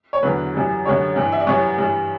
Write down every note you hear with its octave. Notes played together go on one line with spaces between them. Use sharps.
C#5
E2 D3 F#3 B4
F#2 E3 G3
F#2 D3 G3 C#5
G2 E3 G3
E5
D5
F#2 E3 G3 C#5
G2 E3 G3